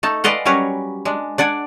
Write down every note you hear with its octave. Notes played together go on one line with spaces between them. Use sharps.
A3 D#4 A5
G#3 B4 D5 D#5 F5 F#5
F#3 G3 C#4 A#4 B4 C#5
G#3 D4
D4 D5 F#5 G#5